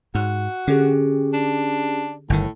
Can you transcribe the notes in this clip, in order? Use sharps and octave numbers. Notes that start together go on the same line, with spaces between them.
G#2 F#4
D3 C#4 G4 G#4
D4
G1 A2 D#3